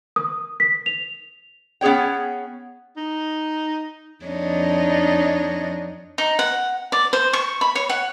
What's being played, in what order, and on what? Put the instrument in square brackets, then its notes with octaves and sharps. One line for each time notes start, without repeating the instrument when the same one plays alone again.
[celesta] D#6
B6
F7
[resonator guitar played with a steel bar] B3 C#4 G#4 C#5 G5
[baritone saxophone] D#4
[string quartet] F2 D4 D#4 C#5 D#5
[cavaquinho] D#4
F#5
D5
C5
C#6
B5
C#5
F#5